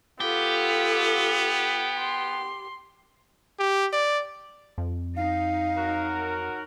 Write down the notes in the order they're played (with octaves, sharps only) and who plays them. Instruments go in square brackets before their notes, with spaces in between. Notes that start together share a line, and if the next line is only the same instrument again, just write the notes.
[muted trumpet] B3 [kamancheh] F4 A4 [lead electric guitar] G4
[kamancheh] C6
[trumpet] G4
D5
[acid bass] F2
[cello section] D#4 [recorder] F5
[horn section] F#3 F#4 A#4